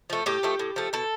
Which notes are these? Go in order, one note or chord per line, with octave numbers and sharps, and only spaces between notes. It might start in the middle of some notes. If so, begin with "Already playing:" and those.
F3 A3
A2 G4
F3 A3
A2
F3 A3
B2 A4